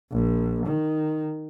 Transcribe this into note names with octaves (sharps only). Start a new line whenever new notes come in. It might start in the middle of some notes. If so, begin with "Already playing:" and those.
A#1
D#3